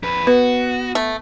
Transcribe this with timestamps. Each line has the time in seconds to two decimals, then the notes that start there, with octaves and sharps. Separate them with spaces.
0.03 F2 B4
0.27 B3 F#4 B4
0.95 A3